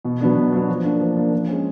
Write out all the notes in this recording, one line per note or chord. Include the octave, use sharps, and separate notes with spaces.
B2
F#3 B3 D4
B2
F#3 B3 D4
F3
A#3 D4
F3
A#3 D4
F3
G#3 C#4